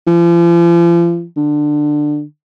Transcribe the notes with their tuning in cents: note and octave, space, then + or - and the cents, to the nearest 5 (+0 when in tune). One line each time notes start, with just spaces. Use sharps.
F3 -40
D3 +15